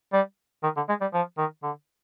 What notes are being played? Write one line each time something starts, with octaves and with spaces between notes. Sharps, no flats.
G3
D#3
D3
G#3
G3
F3
D#3
D3